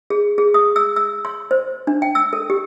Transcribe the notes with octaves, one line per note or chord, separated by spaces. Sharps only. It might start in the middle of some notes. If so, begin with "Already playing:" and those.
G#4
G#4
D#6
E6
E6
C6
C5
D4
G5
E6
A4
G4